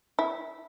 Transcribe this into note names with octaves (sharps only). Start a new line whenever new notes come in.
E4